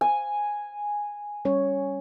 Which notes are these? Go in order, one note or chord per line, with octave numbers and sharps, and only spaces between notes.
G#5
G3 C#4 C#5